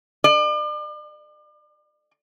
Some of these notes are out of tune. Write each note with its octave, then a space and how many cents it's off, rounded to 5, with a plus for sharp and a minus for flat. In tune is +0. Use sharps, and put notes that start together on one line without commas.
D5 +40